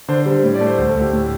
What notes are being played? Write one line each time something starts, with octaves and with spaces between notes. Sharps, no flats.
D3 C5
C5
G3
C5
A2
D5
A3
C5
D2 C5
A4
D2
G4
A2